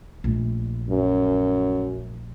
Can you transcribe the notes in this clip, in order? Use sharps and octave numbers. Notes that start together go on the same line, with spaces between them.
A#1 A3
F#2